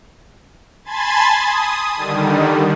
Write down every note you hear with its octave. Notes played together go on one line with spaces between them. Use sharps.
G#5 A5 B5 C6 G#6 A6
D#6
D3 D#3 G3